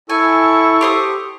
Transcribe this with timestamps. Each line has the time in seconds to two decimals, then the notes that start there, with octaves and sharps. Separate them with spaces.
0.09 E4 A4 G#5 C#6
0.81 G4 C5 D#6